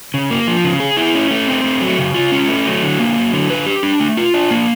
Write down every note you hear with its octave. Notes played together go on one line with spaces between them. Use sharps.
C#3
A#3
F3
C#3
G#4
E4
C#4
A3
C4
A3
F#3
C#3
F4
C#4
A3
F#3
D3
A#3
F#3
D3
B4
G4
D4
A3
F4
D4
A#3